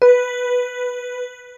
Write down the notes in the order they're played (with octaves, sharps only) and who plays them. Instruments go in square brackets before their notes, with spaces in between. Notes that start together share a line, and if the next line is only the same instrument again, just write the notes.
[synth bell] B4